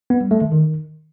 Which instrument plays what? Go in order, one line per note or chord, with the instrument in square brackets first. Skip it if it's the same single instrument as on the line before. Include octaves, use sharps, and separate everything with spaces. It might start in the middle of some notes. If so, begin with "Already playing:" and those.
[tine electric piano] B3
G3
A3
D#3
D#3